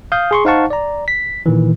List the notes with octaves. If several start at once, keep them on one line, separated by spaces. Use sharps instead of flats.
F5 D#6 G6
G#4 C6 C#6
D#4 C5 F5 F#5 A5 C#6
D5 A#5
B6
A#2 D#3 E3